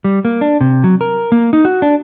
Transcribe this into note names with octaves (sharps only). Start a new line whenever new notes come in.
G3
A#3
D4
C3
F#3
A#4
A#3
D#4
F#4
D4